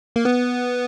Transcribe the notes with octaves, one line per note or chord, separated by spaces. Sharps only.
A#3
B3